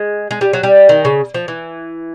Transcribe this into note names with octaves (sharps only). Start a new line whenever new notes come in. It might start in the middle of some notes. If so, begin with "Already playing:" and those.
Already playing: G#3
G#3
G3
F#3
G3
D#3
C#3
F3
E3